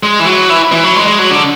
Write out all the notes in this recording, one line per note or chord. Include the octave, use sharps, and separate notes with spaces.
G#3
E3
F#3
E3
E3
F#3
G#3
G#3
F#3
D3